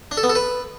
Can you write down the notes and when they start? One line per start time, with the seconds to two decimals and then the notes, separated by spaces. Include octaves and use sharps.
0.11 D4
0.17 A4
0.23 B3
0.29 A4
0.35 B4